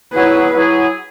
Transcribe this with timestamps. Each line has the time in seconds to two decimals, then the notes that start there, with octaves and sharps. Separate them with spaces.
0.13 F#3 E4 G#4 B4
0.55 F#3 E4 G#4